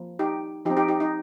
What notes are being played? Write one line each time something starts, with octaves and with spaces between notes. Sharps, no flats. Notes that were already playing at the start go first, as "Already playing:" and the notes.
Already playing: F3 A#3
D#4 G4
F3 C4 D#4 G4
D#4 G4
D#4 G4
D#4